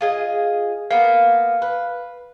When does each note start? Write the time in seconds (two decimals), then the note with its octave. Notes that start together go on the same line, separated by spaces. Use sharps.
0.01 F4 G#4 D#5
0.91 A#3 B3 F5
1.62 B4